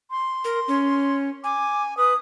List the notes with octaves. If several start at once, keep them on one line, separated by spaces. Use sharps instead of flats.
C6
A#4
C#4
G#5 D6
B4 D#6